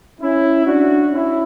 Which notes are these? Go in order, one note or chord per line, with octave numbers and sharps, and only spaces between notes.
C#4 E4
D4 F#4
C#4 E4